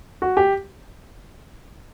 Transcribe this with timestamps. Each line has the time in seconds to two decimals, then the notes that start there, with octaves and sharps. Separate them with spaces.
0.22 F#4
0.37 G4